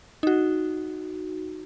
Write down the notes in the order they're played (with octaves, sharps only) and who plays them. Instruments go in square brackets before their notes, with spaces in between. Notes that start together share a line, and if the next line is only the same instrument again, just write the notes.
[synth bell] D#4 F#4